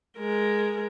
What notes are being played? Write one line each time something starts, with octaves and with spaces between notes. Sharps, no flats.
G#3 A#4